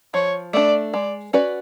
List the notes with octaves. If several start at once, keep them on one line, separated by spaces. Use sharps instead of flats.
F3 C#5
A3 D4 D5
G#3 D5
C#4 F#4 B4 D5